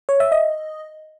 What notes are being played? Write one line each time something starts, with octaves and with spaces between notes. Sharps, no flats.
C#5
E5
D#5